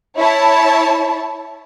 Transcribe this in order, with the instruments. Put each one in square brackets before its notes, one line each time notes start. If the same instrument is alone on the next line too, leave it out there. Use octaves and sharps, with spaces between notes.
[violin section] E4 C#5 A5